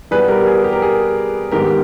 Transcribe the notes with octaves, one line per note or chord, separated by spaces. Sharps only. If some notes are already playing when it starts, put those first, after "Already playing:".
B2 G3 B3 G#4 B4
G4 A#4
G#4
G4
A#4
G#4
G#2 D#3 G#3 B3 G4 A#4